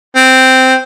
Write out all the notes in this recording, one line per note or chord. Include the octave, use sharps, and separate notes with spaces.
C4